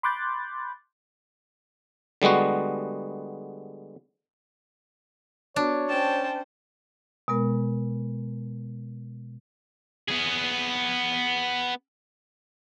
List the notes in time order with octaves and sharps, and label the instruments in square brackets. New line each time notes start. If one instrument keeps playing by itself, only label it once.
[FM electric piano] B5 C6 D6 F#6 G6 A6
[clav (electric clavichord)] D3 G3 G#3 B3 F#4
[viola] B3 F#4 [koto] D4 [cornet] C#5
[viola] C#4 C5 [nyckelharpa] G5 A5
[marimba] B2 G#3 B3 A#4
[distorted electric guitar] B3 G#4